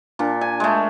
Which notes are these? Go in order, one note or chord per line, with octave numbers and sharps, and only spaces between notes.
A#2 D4
G#5
G#3 A3